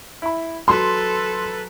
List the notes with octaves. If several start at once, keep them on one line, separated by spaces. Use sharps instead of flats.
E4 B5
F#3 A4 B4 C6